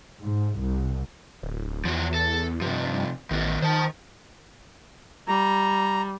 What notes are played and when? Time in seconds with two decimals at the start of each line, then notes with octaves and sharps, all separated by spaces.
0.21 G#2
0.59 C2
1.43 D1
1.85 E2 F3 F#4
2.14 A4
2.62 G2 C3 F3
3.31 A1 D#3 B3
3.62 D#3 C5 A5
5.28 G3 A#5